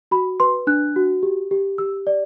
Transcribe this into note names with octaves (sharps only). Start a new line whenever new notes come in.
F#4 B5
B4 C6
D4 F#6
F#4
G4
G4
G4 E6
D5